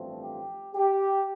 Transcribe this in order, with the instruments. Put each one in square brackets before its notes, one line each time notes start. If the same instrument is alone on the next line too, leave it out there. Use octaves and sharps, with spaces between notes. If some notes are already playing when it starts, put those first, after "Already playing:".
Already playing: [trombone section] A1 G2 F3 A3 C4
G4
G4